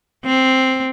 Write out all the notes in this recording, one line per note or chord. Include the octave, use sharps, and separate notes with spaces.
C4